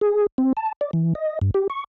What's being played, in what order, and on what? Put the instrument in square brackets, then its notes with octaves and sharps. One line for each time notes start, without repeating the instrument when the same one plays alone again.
[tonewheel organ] G#4
C4
A5
D5
E3
D#5
G2
G4
C#6